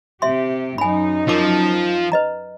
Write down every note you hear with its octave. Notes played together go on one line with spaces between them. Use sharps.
C3 G4 E5 C6
F#2 D#4 G#5 B5
F3 A#4 D6
B4 D#5 A#5